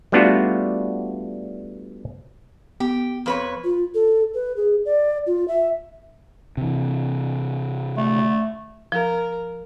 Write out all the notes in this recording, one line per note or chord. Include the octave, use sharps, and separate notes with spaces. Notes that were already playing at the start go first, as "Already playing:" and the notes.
G3 A3 B3 D4 F4 F#4
B3 G4
F2 B4 C#5
F4
A4
B4
G#4
D5
F4
E5
C3 E3
A3
F3 A#4